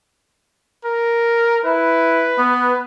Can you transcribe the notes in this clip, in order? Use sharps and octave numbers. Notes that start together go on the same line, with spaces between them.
A#4
E4 B4
B3